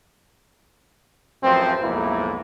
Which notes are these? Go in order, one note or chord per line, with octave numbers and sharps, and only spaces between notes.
A1 F#2 F3 C4
B1 F2 G#2 A#3 E4